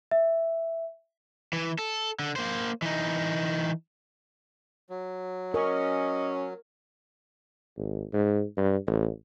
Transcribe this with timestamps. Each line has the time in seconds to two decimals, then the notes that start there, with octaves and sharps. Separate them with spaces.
0.11 E5
1.53 E3
1.79 A4
2.19 D3
2.36 A#3 C5
2.82 E3 D#4
4.90 F#3
5.54 C#4 A#4 D#5
7.77 G#1
8.13 G#2
8.57 G2
8.87 A1